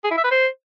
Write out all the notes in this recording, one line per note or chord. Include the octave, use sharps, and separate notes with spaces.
G#4
E4
E5
B4
C5